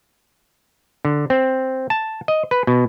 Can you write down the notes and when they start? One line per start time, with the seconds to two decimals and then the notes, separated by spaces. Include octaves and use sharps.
1.05 D3
1.30 C4
1.90 A5
2.28 D#5
2.51 B4
2.67 B2